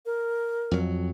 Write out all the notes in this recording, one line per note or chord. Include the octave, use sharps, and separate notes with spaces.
A#4
F2 F#3